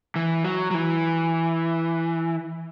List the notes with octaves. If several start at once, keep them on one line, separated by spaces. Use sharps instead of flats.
E3
F#3
F#3
E3